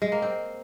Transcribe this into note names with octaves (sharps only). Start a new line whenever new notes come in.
G#3
A#3
C4